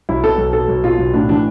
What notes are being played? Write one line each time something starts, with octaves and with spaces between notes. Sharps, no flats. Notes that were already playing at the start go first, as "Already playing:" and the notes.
B1 E4
B2 A4
B1
B2 A4
B1
B2 F4
B1
A2 D4
E3 D4